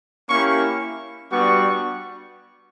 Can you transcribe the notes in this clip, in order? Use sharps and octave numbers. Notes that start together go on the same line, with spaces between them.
A#3 C#4 E4 G4 C#6
G3 B3 D4 F#4 C#6